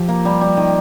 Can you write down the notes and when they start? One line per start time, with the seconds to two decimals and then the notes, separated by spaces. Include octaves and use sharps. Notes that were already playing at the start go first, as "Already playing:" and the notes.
Already playing: F3 G4
0.09 A#3
0.25 G3
0.41 G3
0.57 D#3